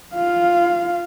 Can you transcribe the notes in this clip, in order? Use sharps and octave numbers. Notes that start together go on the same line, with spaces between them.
F4 F5